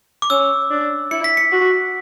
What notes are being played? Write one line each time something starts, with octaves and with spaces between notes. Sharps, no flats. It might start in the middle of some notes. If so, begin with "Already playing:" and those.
D6
C#4 E6
D4
E4 C#7
B6
C#7
F#4